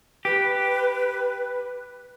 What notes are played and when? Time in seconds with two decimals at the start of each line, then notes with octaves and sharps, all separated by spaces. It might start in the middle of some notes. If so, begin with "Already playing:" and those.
0.25 G4 B4